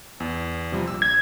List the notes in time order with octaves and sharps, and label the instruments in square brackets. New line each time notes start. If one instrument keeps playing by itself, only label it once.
[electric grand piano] E2
C3 F3 G3
A#1 E6
[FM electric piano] G#6